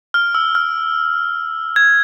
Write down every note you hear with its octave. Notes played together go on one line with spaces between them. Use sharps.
F6
E6
F6
G#6